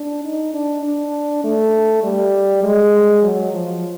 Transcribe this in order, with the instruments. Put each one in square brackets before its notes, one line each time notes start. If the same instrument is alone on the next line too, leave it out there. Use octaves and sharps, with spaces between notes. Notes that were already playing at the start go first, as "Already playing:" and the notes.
Already playing: [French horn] D4
D#4
D4
D4
A3
G3
G#3
F#3
F3